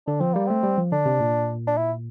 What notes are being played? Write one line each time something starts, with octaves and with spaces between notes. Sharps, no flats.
D3 D4
F3 C4
G3 A#3
A3 C4
G3
F3
D3 D4
C3
A#2
D4
E4